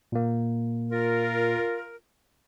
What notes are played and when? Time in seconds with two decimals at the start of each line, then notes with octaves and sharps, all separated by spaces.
0.12 A#2 A#3
0.90 F4 A#4